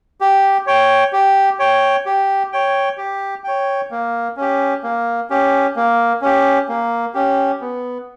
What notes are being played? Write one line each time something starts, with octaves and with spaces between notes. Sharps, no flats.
G4
C#5 G5
G4
C#5 G5
G4
C#5 G5
G4
C#5 G5
A#3
C#4 G4
A#3
C#4 G4
A#3
C#4 G4
A#3
C#4 G4
B3